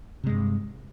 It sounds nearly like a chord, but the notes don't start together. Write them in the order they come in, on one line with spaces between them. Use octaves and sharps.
C3 G#3 G2